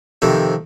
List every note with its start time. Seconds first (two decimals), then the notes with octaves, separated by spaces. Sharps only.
0.22 F2 C3 D#3